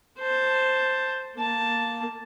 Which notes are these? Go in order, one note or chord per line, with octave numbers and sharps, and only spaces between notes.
C5 A5
A#3 A5